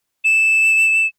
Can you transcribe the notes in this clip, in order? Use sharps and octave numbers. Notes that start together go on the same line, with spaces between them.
E7